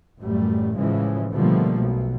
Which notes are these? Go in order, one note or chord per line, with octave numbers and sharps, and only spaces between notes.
A1 F#2 G3 A3
A2 C#3 E3 F3 G#3
B2 D3 F3 G3 A3 A#3
B1 B2